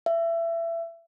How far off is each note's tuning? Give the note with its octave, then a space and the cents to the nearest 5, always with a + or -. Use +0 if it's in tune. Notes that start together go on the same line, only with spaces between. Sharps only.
E5 +25